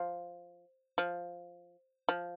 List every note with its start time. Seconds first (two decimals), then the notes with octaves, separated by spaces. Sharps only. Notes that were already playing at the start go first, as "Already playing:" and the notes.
Already playing: F3
0.98 F3
2.09 F3